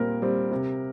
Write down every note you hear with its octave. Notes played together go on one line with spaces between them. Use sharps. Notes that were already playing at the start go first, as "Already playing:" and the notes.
Already playing: A#2 G3 C4 A#4
G3 C4
C3